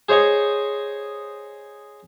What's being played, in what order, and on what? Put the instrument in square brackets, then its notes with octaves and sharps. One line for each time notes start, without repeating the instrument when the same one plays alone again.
[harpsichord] G#4 C5 C#5 D#5 C#6